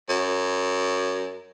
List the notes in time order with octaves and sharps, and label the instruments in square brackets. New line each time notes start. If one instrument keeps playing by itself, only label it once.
[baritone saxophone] F#2